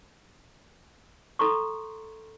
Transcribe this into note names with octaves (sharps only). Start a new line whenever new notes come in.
A4 A#5 C6 C#6